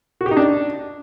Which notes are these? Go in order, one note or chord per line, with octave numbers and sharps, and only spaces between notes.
F#4
G4
D#4
D4